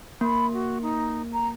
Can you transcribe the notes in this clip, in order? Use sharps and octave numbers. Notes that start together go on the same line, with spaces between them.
A#3 B5
F#4
D#4
A#5